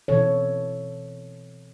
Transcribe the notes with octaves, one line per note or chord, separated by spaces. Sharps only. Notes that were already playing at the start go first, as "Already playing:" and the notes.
B2 E3 C4 A4 C#5